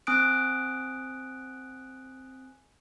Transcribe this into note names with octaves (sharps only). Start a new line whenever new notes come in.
C4 G#5 D#6 F#6 D7